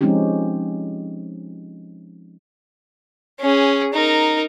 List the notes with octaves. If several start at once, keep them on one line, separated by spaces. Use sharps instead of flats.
F3 G#3 C4 C#4 D#4 G4
C#4 G#4
D#4 A#4